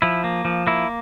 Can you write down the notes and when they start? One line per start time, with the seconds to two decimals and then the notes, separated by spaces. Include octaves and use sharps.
0.02 F3 E4
0.24 A#3
0.45 F3
0.67 A#3 E4